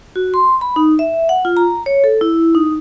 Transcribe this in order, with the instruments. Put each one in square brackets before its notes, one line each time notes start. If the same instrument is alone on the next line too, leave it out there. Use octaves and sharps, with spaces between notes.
[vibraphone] F#4
C6
B5
D#4
E5
F#5
F4
A#5
C#5
A4
E4
D#4